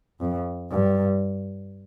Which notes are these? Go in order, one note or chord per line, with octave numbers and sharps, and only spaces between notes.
F2
G2